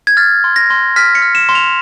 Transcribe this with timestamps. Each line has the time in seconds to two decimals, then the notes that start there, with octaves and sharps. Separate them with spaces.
0.07 G#6
0.17 F6 A6
0.44 C6
0.56 A#6
0.70 C6
0.96 F6 B6
1.15 C#7
1.22 F6
1.35 E7
1.49 C6
1.55 F7